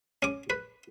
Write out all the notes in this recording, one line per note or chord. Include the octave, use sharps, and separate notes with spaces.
C#4 D6
B4